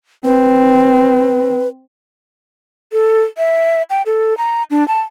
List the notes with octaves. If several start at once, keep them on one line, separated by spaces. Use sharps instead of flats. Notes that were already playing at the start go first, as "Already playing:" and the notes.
C4 B4
A4
E5
G5
A4
A#5
D4
A5